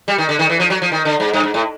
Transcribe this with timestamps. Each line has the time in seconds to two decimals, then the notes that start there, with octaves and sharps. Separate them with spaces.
0.08 G3
0.18 D#3
0.29 D3
0.39 D#3
0.50 E3
0.60 F3
0.70 F#3
0.82 F3
0.92 D#3
1.05 D3
1.20 G#2
1.33 G2
1.44 G#2
1.54 A2